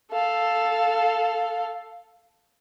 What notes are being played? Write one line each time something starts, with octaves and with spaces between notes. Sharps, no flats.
A4 F5